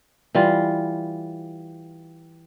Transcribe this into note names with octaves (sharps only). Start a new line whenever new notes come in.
E3 G3 F4